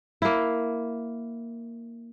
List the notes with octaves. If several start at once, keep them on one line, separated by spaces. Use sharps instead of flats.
A#3 E4